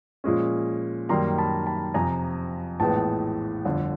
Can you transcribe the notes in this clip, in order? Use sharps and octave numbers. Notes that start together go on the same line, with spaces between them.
A#2 F3 G#3 C#4
F#2 D#3 G3 A#3 D#4 A#5 C6
A5 B5
A5 B5
F2 C3 F3 G#5 A#5
A#1 A2 E3 G#3 B3 G5 A5
G1 F2 D3